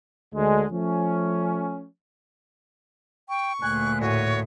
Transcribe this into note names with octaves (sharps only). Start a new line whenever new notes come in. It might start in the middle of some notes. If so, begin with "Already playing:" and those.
D2 D3 G#3
F3 A3 C#4
G5 C#6
D2 A#2 G#5 F#6
A2 F#4 C#5 D#7